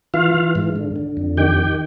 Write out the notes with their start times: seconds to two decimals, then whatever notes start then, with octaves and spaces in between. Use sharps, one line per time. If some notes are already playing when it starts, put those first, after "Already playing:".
0.14 E3 F4 F5
0.34 E3
0.55 G#2
0.76 D3
0.96 D3
1.17 F2
1.37 D#3 G4 G5
1.58 D#3